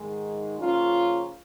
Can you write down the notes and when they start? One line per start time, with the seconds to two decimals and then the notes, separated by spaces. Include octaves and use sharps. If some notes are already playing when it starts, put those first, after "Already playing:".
Already playing: G#2 D#3 G#3
0.58 C#3 F3 A#3 C#4 F4